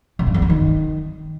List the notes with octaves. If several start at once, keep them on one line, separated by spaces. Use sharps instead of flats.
C3
G2
E2
G2
D#3